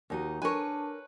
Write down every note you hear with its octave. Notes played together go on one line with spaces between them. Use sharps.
D#2 D#4 F#4
D4 A#4 B4 C#5 G#5